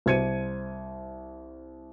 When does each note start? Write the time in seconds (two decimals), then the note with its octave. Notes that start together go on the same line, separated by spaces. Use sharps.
0.06 C2 C5 G#6 C#7 D#7